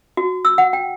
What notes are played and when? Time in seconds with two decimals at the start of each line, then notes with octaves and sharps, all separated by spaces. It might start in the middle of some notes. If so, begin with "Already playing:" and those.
0.17 F#4
0.45 E6
0.58 F#5
0.73 G5